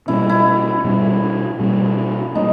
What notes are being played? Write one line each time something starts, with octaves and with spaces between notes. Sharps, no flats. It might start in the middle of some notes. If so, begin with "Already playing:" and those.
B2 G3 A#3 C#4 E4
E4
B2 G3 A#3 C#4
B2 G3 A#3 C#4
B2 G3 A#3 C#4 D#4